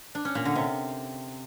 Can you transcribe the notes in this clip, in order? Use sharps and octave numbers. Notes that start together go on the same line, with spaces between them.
D4
C#4
A#2
D3
C3